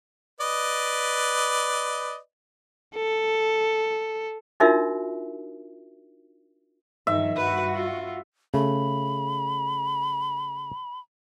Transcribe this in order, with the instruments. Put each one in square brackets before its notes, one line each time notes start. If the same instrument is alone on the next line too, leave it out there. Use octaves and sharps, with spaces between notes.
[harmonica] B4 D5 D#5
[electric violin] A4
[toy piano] D4 D#4 F4 F#4 A#4 E5
[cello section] G2 D#3 F3 [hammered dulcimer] E5
[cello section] G2 F#4 [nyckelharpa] B4
[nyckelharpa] F4
[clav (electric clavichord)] C#3 A3 [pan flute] B5